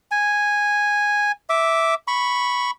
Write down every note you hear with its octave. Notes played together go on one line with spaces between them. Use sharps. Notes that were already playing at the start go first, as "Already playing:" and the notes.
G#5
E5 D6
B5 C#6